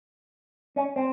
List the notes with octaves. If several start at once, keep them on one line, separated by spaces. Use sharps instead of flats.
C#4
C4